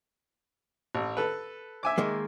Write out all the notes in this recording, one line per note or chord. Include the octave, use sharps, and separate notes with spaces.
A1
A4 B4
E5 G#5 D6
D#3 G#3 A#3